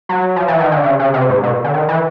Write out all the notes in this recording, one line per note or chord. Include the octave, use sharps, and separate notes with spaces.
F#3
F3
E3
D#3
D3
C#3
C#3
C3
G#2
B2
D3
D#3
E3